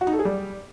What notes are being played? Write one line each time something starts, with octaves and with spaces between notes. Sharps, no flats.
F#4
D#4
A4
G#4
G3